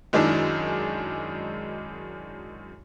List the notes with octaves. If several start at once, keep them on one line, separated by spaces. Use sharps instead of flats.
F#2 D#3 G#3 D4 E4